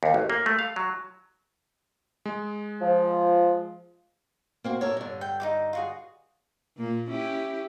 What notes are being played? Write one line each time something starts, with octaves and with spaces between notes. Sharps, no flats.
D#2
A1
A#3
A3
F5
F#3
G#3
F3
A#3 C4 F#4
A4 A#4 C#5 D5
G2 D3
G5
D#4 F4 D6
F4 F#4 G#4
A#2 A#3
C#4 E4 G4